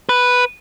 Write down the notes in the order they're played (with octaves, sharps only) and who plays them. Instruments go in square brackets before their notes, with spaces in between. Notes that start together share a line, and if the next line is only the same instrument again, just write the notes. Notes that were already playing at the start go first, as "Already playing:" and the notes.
[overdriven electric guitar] B4